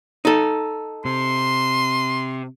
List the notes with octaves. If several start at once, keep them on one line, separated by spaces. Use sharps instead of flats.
D#4 A4
C3 C6